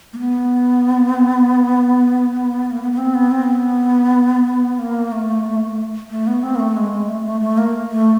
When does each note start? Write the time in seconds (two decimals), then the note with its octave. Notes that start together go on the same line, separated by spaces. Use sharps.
0.13 A#3
0.19 B3
2.71 A#3
2.82 B3
2.92 B3
2.98 C4
3.15 B3
3.31 C4
3.47 B3
4.79 A#3
5.12 A3
6.10 A3
6.27 B3
6.43 C4
6.56 A#3
6.60 A3
6.76 G#3
6.92 G#3
7.09 A3
7.25 A3
7.41 A3
7.58 A#3
7.91 A3